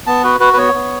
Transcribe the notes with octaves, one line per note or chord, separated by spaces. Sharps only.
B3 A5
F#4 B4
F#4 B4
B4
B3 C#5
B3